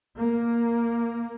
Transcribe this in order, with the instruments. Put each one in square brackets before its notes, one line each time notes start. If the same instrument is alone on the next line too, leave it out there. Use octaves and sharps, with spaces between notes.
[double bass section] A#3